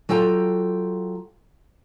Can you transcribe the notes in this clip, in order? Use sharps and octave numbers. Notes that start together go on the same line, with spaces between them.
F#3 F4 A4 G5 A5 A#5